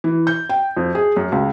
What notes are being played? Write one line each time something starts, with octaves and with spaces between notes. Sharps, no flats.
E3
G6
G5
F2
G#4
F#2
C#2